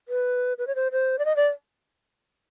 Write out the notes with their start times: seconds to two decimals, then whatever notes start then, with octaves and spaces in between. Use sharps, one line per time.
0.08 B4
0.58 B4
0.67 C#5
0.75 C5
0.92 C5
1.19 D5
1.25 D#5
1.36 D5